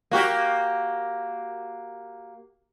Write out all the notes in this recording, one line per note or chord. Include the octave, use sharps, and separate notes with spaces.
A#3 F#4 G4